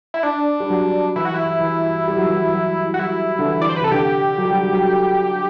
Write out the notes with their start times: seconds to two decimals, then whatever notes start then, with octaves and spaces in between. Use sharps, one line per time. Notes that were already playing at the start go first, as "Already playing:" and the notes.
0.14 E4
0.23 D4
0.60 G3
0.70 F#3
1.16 E3 E4
1.25 F#4
1.34 E4
1.61 E3
2.08 G3
2.17 F#3
2.26 E3
2.36 F#3
2.54 F#3
2.94 F#4
2.99 F#3 E4
3.39 D3
3.45 E3
3.62 D5
3.69 C5
3.76 B4
3.81 C3 A4
3.92 D3 G4
4.37 F#3
4.45 G3
4.53 F#3
4.64 G3
4.73 F#3